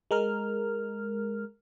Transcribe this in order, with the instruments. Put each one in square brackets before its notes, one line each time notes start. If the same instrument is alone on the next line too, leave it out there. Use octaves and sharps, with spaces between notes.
[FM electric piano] G#3 A#4 F6